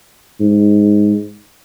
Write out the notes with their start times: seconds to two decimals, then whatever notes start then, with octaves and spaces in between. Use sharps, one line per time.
0.40 G#2